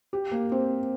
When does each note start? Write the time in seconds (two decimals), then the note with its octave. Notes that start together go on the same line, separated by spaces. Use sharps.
0.13 G4
0.32 A#3
0.52 C4